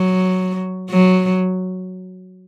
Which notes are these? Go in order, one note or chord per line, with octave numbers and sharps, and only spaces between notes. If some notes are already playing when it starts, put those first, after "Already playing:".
Already playing: F#3
F#3